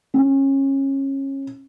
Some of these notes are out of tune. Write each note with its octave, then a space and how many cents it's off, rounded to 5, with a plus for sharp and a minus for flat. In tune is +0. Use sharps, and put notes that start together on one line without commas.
C#4 -25